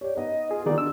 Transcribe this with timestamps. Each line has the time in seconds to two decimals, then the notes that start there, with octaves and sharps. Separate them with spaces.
0.01 G4 C#5 D5
0.16 B3 D#4 D#5
0.51 F4 G#4
0.66 D#3 B3 D#4 F4 F#4 G#4 D5
0.78 D4 E6